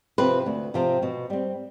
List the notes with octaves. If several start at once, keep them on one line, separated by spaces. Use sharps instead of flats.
C3 F3 C4 B4
D2
C3 F3 C4
B2
G3 C4